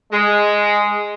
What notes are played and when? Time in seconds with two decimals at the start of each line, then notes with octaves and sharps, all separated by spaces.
0.12 G#3